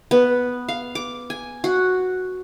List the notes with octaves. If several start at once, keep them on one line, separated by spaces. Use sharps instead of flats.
B3
F5
D6
G#5
F#4